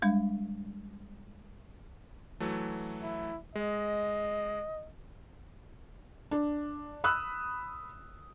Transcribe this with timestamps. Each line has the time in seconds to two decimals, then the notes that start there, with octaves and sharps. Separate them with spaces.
0.02 G3 G#3 D4
2.40 E3 F#3 A3
3.03 E4
3.55 G#3 D#5
6.31 D4
7.04 B5 D#6 E6 F#6